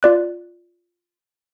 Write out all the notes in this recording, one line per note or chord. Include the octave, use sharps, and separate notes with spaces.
F4 D5 F#6